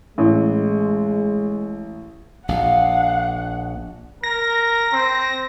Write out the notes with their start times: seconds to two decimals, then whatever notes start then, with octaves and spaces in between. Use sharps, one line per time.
0.18 A1 G#3
2.49 A#1 F5 F#5
4.23 A#4 A#6
4.93 C4